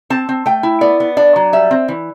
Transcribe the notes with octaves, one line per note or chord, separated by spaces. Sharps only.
C4 A5
C4
A3 G5
E4
B3 D5
B3
D4 D5
F#3
G3 E5
C4
E3